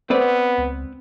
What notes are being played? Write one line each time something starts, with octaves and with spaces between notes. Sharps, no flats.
B3 C4 B4 D5
C#2